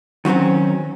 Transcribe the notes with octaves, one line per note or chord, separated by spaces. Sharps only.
D#3 F#3 A#3 C4 C#4